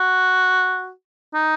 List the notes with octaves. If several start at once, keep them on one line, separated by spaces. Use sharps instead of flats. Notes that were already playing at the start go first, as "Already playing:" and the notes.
Already playing: F#4
D#4